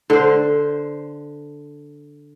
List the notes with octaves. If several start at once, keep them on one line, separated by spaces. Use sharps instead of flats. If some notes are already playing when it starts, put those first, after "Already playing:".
D3 C5